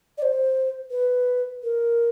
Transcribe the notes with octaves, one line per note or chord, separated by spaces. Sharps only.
D5
C5
B4
A#4